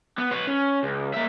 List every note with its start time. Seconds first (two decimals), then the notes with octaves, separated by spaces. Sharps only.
0.18 B3
0.31 B4 C#5
0.47 C#4
0.83 C#2
1.14 A#3 E5